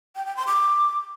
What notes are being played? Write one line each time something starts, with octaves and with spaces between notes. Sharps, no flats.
G5
G5
C6
D6